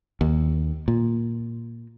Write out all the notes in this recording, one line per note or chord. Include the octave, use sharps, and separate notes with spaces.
D#2
A#2